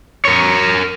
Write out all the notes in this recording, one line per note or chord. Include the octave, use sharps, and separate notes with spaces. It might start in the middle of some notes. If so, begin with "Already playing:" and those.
A#4 C#5